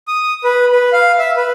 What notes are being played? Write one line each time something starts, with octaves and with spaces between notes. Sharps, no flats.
D#6
B4
B4
F5
E5
B4